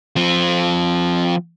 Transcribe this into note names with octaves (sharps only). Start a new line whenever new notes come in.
F3 C4